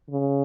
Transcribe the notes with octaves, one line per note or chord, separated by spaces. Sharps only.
C#3